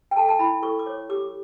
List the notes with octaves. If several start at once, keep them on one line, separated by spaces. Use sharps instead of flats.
G5
A4 A5
A5
E4 B5
A4 C#6
D6
C#5
G4 D6